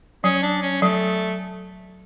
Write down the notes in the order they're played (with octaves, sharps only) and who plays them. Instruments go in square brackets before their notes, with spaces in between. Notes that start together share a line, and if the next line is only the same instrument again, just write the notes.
[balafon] F#3 [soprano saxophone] C#4
[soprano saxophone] D4
C#4
[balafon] F#3 [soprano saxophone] A3